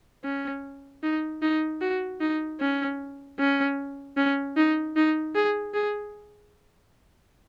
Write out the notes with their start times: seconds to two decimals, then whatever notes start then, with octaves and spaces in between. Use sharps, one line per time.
0.24 C#4
1.03 D#4
1.42 D#4
1.81 F#4
2.21 D#4
2.61 C#4
3.39 C#4
4.17 C#4
4.57 D#4
4.96 D#4
5.35 G#4
5.74 G#4